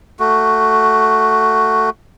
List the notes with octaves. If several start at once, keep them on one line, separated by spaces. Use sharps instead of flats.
A3 F#4